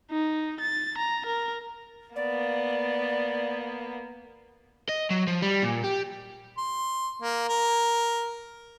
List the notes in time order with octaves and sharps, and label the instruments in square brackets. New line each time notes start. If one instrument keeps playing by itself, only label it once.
[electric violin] D#4
A6
A#5
A#4
[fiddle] A#3 B3 [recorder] D5
[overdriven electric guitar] D#5
F#3
F3
G3
A#2
G4
[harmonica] C6
A#3
A#4